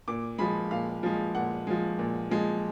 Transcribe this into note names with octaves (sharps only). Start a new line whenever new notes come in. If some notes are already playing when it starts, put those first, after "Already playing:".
A#2 D6
F3 G#3 B5
A#2 F5
F3 G#3
A#2 F#5
F3 G#3
A#2
F3 G#3